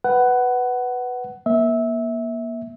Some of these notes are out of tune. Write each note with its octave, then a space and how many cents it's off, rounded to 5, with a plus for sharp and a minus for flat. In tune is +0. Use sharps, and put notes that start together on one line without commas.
B4 +5 F#5 +15
A#3 +30 E5 -20